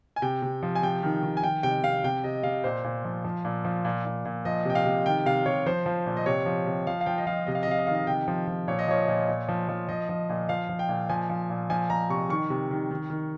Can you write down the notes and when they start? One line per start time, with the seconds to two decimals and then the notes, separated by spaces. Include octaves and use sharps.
0.16 G#5
0.22 C3 G5
0.42 C3
0.63 F3
0.75 G#5
0.82 C3 G5
1.03 D#3
1.23 D#3
1.37 G#5
1.44 D#3 G5
1.63 C3 G5
1.83 C3 F5
2.04 C3 G5
2.24 C3 D#5
2.43 C3 F5
2.64 A#2 C5
2.84 A#2
3.05 F3
3.25 F3
3.45 A#2
3.65 F3
3.85 A#2
4.05 A#2
4.25 A#2
4.45 F3 D#5
4.65 C3 G5
4.75 F5
4.85 C3
5.06 D#3 G5
5.26 C3 F5
5.46 C3 C#5
5.66 F3 C5
5.86 F3
6.06 A#2
6.17 D#5
6.26 C3 C#5
6.46 F3
6.66 C3
6.87 F3 F5
7.01 F5
7.06 F3 G5
7.18 D#5
7.26 F3 F5
7.47 C3 D#5
7.55 F5
7.63 D#5
7.67 C3 F5
7.79 D#5
7.87 D#3 F5
7.95 D#5
8.07 C3 G5
8.28 F3
8.47 F3
8.68 A#2 C#5
8.79 D#5
8.88 F3 C#5
9.08 A#2
9.28 A#2
9.49 F3
9.69 F3
9.88 F3 D#5
10.09 F3
10.29 A#2
10.49 F3 F5
10.69 F3
10.79 G5
10.89 A#2
11.09 F3 G#5
11.30 F3
11.50 A#2
11.70 F3 G#5
11.90 F3 A#5
12.10 C3 C#6
12.29 D#3 C#6
12.50 C3
12.71 D#3
12.91 D#3
13.10 D#3